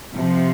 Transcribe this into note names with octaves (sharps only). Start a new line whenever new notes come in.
C3 F3